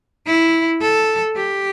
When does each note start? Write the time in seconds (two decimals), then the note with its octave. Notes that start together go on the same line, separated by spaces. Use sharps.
0.26 E4
0.81 A4
1.36 G4